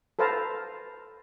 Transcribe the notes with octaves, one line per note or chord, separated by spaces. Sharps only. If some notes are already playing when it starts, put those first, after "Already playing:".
A4 B4 C5 F5 A5 A#5